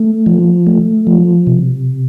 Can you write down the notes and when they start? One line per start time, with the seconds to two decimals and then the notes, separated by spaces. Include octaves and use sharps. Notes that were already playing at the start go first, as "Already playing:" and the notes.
Already playing: A3
0.26 F3
0.67 A3
1.07 F3
1.47 C3